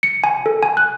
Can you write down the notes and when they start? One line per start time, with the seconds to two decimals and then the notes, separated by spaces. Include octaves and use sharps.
0.03 C#7
0.24 G#5
0.46 A4
0.63 G#5
0.77 F#6